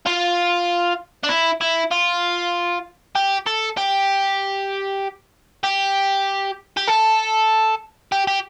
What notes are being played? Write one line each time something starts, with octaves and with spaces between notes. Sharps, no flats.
F4
D4
E4
E4
F4
G4
A4
G4
G4
G4
A4
G4
G4